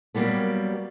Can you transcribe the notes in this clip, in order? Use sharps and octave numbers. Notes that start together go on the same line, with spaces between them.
F#3 G3 A#3 B3